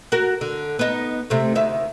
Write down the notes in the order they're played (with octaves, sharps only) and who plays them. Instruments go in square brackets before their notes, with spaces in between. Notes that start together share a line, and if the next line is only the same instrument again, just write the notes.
[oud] F#4 A#4
D3
B3 D#4
C3 A3
D2 D#3 E5